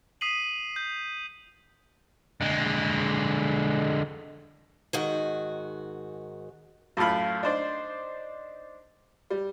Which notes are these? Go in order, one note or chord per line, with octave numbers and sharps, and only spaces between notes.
D#6 B6 C7 D#7 F#7
G6
D3 G#3
G#2 D#3 F#4
F#2 A2 A3 F4 B5
D4 D#4 C5 D5
G3